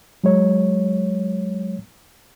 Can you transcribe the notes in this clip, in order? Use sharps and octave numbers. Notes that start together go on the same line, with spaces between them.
F#3 G#3 C#5